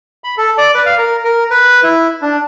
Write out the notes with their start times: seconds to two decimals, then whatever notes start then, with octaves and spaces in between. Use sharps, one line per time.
0.24 B5
0.38 A4
0.58 D5
0.75 B4
0.86 F5
0.98 A#4
1.24 A#4
1.51 B4
1.83 E4
2.22 D4